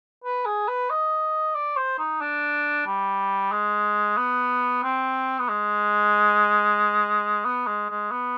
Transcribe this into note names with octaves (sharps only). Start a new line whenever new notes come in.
B4
G#4
B4
D#5
D5
C5
D#4
D4
G3
G#3
B3
C4
B3
G#3
B3
G#3
G#3
B3